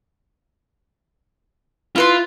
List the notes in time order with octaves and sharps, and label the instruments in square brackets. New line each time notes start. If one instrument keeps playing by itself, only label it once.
[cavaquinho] E4 B4 C6 [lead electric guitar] F4